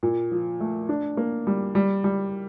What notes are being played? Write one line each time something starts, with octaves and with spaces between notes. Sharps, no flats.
A#2
F3
A3
D4
A#3
G3
G3
G3